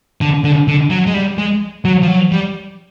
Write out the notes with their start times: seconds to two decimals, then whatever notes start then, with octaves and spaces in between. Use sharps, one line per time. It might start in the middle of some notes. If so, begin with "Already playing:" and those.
0.21 D3
0.44 D3
0.68 D3
0.90 F#3
1.07 G#3
1.14 G3
1.38 G#3
1.85 F#3
2.03 F3
2.08 F#3
2.32 G3